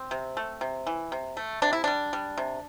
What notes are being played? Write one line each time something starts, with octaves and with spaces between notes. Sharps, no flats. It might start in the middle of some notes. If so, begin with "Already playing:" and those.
Already playing: C4
C3
A3
C3
E3
C3
A3
C3 D4
E4
G3 D4
G3
C3